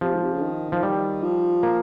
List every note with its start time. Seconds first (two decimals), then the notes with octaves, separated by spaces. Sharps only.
0.01 C3 F3
0.13 G#2
0.22 C3
0.33 C#3
0.42 D#3
0.72 F3
0.83 G3
1.23 F3
1.63 A#3